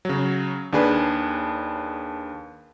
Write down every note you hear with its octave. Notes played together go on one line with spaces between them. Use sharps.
C#3 F#3
D#2 D4 G#4 B4